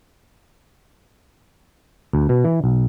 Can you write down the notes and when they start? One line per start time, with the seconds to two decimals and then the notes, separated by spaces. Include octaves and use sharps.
2.13 D2
2.29 B2
2.44 E3
2.64 B1